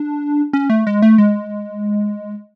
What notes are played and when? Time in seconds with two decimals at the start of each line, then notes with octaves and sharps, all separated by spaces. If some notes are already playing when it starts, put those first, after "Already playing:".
Already playing: D4
0.53 C#4
0.70 A3
0.87 G#3
1.02 A3
1.18 G#3